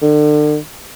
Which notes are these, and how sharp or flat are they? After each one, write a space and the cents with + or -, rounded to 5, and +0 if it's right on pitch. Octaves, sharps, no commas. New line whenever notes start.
D3 +35